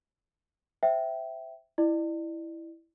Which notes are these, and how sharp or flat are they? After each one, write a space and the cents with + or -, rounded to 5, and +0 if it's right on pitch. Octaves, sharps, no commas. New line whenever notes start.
C5 +0 E5 +0 G5 -15
E4 +0 D5 +35